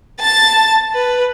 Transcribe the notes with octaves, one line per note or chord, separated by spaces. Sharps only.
A5 A6
B4